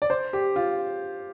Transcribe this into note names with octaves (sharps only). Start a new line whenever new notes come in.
D5
C5
G4
F4